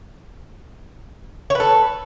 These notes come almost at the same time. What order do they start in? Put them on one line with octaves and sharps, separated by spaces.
C#5 B4 A4